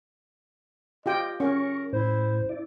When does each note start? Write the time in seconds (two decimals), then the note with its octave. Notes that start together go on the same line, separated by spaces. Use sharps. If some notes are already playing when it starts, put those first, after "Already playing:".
1.06 F4 G4 D#5 G5
1.40 C#4 A#4 C#6
1.93 A2 E4 C5
2.49 E4 D5